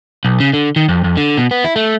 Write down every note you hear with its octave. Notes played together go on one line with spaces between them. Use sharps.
B1
C#3
D3
D#3
F2
F2
D3
B2
B3
E4
A3